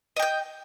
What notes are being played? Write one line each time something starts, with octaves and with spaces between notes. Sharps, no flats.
D#5 G5 G6